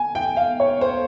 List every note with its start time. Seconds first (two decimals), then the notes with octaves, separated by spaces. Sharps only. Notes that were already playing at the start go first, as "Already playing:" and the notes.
Already playing: G#5
0.15 G5
0.37 F5
0.60 C#5
0.81 C5